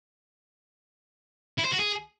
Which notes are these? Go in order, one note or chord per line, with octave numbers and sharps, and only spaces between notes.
E4
C5
F#4
G#4